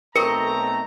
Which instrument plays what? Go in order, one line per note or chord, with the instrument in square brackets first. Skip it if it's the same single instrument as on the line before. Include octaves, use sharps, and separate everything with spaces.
[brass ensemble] B1 A3 A#5 [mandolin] C4 D#5 C#6 [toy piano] A#4 [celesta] C#7